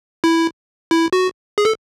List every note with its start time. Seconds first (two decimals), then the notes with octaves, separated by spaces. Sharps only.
0.24 E4
0.91 E4
1.13 F#4
1.58 G#4
1.65 A4